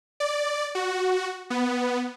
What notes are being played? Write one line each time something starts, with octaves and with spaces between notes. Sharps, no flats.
D5
F#4
B3